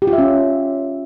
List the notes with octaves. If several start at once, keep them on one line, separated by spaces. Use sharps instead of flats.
G4
F4
E5
C#4